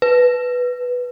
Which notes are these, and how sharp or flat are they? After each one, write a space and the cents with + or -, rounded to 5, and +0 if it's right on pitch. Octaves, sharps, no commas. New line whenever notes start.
B4 +0